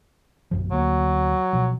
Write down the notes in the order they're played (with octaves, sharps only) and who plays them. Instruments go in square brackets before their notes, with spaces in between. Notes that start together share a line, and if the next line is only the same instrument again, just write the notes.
[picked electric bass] A#1 F#2 F3
[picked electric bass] D2 A#3 [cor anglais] F#3
[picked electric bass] B2 F3